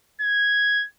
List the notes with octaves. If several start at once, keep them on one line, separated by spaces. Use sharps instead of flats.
G#6